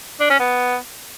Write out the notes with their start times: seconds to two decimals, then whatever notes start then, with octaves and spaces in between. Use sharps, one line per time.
0.20 D4
0.30 C#4
0.40 B3